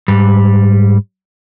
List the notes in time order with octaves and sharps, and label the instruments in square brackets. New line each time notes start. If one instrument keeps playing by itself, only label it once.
[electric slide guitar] G#2 G3